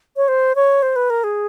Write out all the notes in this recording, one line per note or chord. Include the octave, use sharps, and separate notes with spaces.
C#5
C5
C#5
C5
B4
A#4
G#4